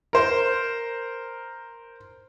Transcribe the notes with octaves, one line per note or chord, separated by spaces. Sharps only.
A#4 C5